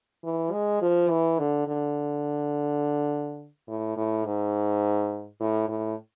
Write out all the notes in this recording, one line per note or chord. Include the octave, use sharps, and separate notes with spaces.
E3
G#3
F3
E3
D3
D3
A2
A2
G#2
A2
A2